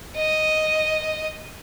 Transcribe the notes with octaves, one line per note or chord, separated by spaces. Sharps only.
D#5